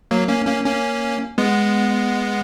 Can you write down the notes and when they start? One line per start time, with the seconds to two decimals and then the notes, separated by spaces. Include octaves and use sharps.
0.11 F#3 A#3
0.28 A#3 C#4
0.47 A#3 C#4
0.66 A#3 C#4
1.38 G#3 B3